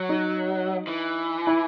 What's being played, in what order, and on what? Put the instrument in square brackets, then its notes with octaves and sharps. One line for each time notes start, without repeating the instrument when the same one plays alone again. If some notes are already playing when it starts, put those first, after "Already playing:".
Already playing: [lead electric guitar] F#3
[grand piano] D#4
[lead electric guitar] E3
[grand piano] E4